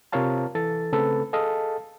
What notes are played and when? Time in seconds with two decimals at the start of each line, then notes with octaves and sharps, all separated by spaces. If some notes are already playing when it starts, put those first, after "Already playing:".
0.12 C3 F4 A#4 C#5 F5 A5
0.55 E3 A4 A6
0.92 C#3 A3 C4 A4 B4
1.33 G#4 A4 D#5 F5 A5